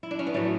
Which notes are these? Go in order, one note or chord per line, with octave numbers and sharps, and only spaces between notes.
E4
D4
C#4
B3
A2 F#3 A3